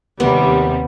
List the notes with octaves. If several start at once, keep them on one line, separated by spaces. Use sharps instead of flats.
D#2 C3 G3 B3